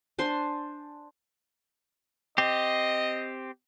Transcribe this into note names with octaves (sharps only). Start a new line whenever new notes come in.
D4 C5 G#5 C6
C4 G4 D#5